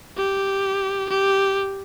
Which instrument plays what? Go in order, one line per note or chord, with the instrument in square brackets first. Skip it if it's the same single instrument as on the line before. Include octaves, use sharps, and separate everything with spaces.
[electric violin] G4
G4